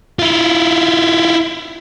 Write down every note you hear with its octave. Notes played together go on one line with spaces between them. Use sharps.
E4 F4